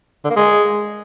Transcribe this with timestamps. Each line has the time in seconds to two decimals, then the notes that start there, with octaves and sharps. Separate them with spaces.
0.25 D3
0.31 A#3
0.36 G#3